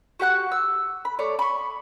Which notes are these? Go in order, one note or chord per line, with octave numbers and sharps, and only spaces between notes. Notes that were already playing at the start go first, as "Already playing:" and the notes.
F#4 G4 F#5 F#6
E6
B5
A3 C#5 D5
B5 C#6